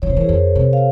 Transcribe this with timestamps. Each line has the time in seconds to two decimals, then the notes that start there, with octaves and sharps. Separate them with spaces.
0.02 E3 C#5
0.10 C#3 C5
0.17 E3 A#4
0.24 F2 G#4 C5
0.56 C3
0.73 F5